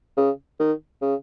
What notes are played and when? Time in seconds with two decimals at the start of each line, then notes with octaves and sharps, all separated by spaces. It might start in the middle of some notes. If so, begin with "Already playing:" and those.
0.17 C#3
0.60 D#3
1.02 C#3